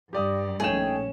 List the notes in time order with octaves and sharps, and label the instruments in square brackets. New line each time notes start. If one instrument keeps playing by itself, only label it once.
[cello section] G2 [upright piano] G4 D5 D#6
[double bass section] A#1 C#4 [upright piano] A3 D#4 E7 [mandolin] G#4 G5